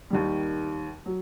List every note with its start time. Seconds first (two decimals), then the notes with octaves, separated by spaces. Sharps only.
0.10 D#2 D#3 G3
1.06 F#3